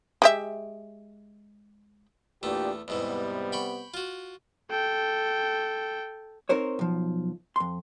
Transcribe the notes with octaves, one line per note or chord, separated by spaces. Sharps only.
G#3 G4 E5
E2 A#2 A3 D4 G4
E2 G#2 C3 E3 G3 B3
G5 B5 C#6
F4 F#4
A4 G5
C4 D#4 A#4 C5 C#5
B1 F3
F2 C6